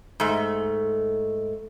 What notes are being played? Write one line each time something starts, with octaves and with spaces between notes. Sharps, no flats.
G#2 A3